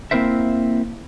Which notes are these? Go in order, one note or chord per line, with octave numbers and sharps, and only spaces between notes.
A#3 C4 E4 A#4 C5 E5